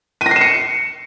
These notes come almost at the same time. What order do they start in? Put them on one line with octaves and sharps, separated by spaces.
D#7 A#6 C7 E7 C#7